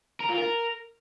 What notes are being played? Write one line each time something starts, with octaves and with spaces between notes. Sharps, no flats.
A#4
F4
A#4